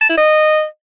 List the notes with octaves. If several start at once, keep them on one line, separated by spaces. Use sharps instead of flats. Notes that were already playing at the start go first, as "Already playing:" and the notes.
A5
E4
D#5